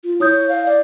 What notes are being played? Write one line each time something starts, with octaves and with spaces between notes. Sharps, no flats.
F4
E4 C#5 D#6 G6
F5
D5